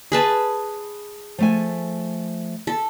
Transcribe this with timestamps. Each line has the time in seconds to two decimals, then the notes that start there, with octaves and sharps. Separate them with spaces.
0.12 G#4 B4 A5
1.38 F3 A3 G#5
2.67 A4